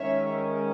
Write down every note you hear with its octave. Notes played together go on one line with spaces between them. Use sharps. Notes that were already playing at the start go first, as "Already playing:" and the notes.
Already playing: D#3 G#3 C#4 C#5 E5